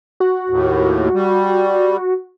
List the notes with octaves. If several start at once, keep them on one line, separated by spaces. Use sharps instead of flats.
F#4
D#2 A2
G3